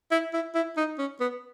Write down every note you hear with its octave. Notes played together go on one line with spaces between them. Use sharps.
E4
E4
E4
D#4
C#4
B3